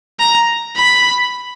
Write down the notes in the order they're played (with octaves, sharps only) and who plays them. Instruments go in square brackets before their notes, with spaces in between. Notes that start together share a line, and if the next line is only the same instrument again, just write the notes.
[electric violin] A#5
B5